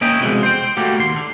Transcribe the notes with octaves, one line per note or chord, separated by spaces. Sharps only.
A#3 C#4 E4 D#5 G5
C2 F2 B2 E3 G#3
C5 G5
G3 A3 A#3 F#4 G4
D#2 C6
D3